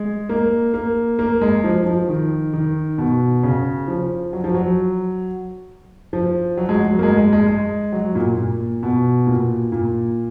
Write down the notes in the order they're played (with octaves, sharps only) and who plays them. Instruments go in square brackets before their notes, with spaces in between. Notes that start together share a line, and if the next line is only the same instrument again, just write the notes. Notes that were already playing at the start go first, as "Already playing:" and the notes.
Already playing: [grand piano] G#3
A#3
A#3
A#3
G#3
F3
F3
D#3
D#3
B2
C#3
F3
F#3
F3
F#3
F3
F#3
G#3
F#3
A#3
G#3
G#3
G#3
G#3
F#3
A#2
A#2
B2
A#2
A#2